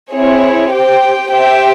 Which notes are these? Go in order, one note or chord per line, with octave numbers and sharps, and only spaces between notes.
C4 E4 G#4 C#5
G4 C5 G5
G4 C5 E5 G5